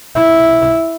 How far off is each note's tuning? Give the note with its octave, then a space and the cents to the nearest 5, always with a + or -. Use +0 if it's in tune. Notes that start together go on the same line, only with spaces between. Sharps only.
E4 -5